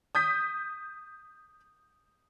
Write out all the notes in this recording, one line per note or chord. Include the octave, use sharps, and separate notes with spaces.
D#6 G6 B6